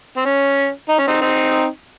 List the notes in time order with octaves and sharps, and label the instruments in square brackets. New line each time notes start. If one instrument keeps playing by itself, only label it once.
[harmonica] C4
C#4
D#4
C#4
C4 D#4
C4 D#4